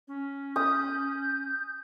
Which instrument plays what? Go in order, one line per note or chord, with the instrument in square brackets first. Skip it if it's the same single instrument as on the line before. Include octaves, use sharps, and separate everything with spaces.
[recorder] C#4
[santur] D#6 [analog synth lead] G6